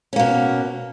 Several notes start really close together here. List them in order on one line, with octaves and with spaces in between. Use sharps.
C#4 A#3 B2